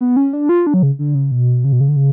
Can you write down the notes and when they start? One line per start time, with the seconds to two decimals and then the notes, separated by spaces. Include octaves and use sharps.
0.01 B3
0.16 C#4
0.33 D4
0.49 F4
0.67 D4
0.74 F#3
0.83 C#3
0.99 D3
1.15 C#3
1.31 B2
1.64 C#3
1.72 B2
1.80 C#3
1.88 D3
1.96 C#3